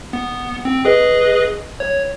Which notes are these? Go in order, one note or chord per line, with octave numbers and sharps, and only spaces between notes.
B3
C4
G#4 B4 D#5
C#5